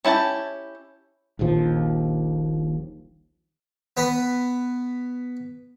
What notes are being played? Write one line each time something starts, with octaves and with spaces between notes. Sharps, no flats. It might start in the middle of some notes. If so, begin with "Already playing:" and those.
C#4 E4 G4 A5
D#1 A#1 D#2 F3
B3 B4